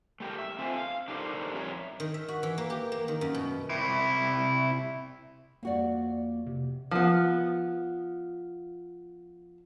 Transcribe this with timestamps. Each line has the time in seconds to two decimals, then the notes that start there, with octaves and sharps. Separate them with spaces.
0.20 A3 G4 A#4
0.38 E5
0.58 C4 F4 A4 C5 G#5
0.77 F5
1.08 D4 D#4 G4 A4 A#4 C5
1.53 F2 A2 C#5 E5 A#5
2.00 D#3
2.14 E5
2.28 F#4
2.43 E3
2.58 A#3
2.70 G4
2.92 A#3
3.08 D#3
3.21 F#2
3.34 B2
3.70 C3 E4
5.63 F2 A#3 F#4 D5
6.46 C3
6.91 F3 B3